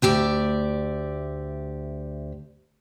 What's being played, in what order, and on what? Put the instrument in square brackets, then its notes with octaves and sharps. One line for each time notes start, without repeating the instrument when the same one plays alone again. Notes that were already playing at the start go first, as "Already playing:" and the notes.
[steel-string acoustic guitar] D2 G4 D5 E5